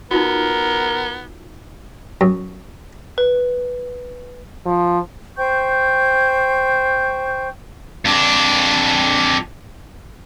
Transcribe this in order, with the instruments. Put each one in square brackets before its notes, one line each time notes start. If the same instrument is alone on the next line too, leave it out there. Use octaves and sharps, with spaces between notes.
[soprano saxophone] B3 [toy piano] D#4 F4 F#4 [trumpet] A#4
[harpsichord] F#2
[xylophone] B4
[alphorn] F3
[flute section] C5 G5 C#6 G6
[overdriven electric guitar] F2 D4